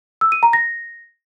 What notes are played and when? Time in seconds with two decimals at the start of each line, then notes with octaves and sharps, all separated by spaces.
0.21 E6
0.32 D#7
0.43 A#5
0.53 A#6